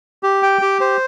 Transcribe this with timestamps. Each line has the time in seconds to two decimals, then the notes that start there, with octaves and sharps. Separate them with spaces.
0.23 G4
0.43 G5
0.62 G4
0.81 C5